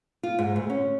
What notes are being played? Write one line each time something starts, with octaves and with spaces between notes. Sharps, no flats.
F4
G#2
D2
C#4